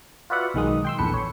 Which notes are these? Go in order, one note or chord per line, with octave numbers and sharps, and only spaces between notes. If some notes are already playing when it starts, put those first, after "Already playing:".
F4 F#4 B4 D5 E5 F#5
B1 D#3 G#3 D#6
G5 C6 E6
A#1 E2 A4 B4 C#7
C#5